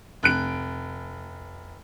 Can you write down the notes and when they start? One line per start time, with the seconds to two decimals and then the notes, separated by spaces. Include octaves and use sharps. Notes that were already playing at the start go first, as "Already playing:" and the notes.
0.23 F1 F#6 D7